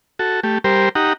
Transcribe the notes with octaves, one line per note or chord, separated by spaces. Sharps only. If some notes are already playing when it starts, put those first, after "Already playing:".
F#4 A4
A3 G4
G3 G4 A#4 C5
D#4 G4 F#5 A#5